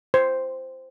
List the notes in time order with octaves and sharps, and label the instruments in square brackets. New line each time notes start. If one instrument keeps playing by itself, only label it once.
[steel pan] C5